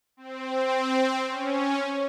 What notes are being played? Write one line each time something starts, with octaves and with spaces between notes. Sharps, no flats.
C4
C#4